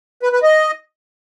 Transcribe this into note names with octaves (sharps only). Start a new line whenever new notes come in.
B4
B4
D#5